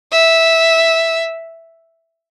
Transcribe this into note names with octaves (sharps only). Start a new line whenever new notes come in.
E5